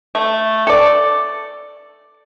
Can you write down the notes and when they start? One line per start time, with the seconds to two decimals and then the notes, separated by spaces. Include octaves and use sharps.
0.15 A3
0.67 A4 D5